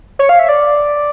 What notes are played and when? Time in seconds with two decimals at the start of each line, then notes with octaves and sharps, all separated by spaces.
0.19 C#5
0.29 F5
0.39 E5
0.49 D5